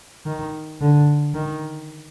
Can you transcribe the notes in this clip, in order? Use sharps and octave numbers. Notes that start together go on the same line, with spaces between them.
D#3
D3
D#3